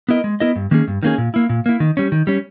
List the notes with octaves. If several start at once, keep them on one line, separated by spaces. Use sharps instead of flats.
B3 E4 A#4 D#5
G#3
B3 E4 A#4 D#5
G2
D#3 A#3 C#4 G#4
G2
D#3 A#3 C#4 G#4
A#2
A#3 E4
A#2
A#3 E4
D#3
G3 C#4
D#3
G3 C#4